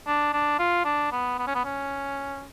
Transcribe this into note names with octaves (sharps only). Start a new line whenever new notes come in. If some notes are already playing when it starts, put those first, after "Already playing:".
D4
D4
F4
D4
B3
B3
C#4
B3
C#4